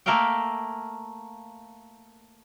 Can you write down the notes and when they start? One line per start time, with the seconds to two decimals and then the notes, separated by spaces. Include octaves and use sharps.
0.06 A3 A#3 A#4 E5 F5 G5